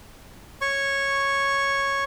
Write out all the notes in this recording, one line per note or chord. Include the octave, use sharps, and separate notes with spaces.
C#5 C#6